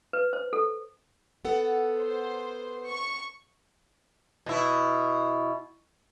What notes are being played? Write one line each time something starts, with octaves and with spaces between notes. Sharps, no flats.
B4
C5
A4
B3 A4 F#5
C5
C#6
B2 E4